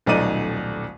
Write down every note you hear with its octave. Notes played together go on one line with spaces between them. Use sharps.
D#1 B1 A3 D#4 D5 D#7